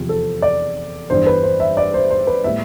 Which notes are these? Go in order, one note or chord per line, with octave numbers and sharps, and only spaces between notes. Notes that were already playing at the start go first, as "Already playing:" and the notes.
Already playing: E2 C3 F3 C4 F4
A4
D5
G1 G2 E3 C5
B4
C5
E5
D5
C5
C5
B4
A2 G3 B3 E4 E5